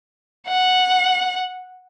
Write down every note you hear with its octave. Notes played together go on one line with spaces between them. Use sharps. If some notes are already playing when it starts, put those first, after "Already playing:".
F#5